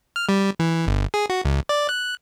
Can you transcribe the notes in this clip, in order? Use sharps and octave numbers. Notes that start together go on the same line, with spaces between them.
F6
G3
E3
G1
G#4
F#4
C#2
D5
F#6